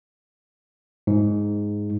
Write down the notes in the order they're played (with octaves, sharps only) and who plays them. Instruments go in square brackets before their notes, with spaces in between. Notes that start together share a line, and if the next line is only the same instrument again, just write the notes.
[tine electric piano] G#2